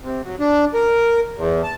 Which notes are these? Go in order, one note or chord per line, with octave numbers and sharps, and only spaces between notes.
C3
F#3
D4
A#4
E2
A5